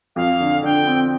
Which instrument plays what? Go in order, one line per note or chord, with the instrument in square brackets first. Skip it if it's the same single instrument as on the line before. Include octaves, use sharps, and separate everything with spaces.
[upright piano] F2 [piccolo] F5
[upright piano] D3
[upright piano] D3 [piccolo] G5
[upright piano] C4